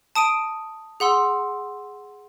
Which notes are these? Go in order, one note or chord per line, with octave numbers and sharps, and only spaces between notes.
A5 D#6 D7 D#7
G#4 F#5 C6 E6